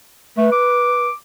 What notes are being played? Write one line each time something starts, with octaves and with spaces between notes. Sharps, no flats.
A3 B4
D6